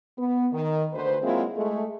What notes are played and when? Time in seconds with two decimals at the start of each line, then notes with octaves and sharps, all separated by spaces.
0.18 B3
0.53 D#3
0.93 D2 B4 C5
1.23 F#3 G#3 A#3 C4 E4 F4
1.56 G#3 A3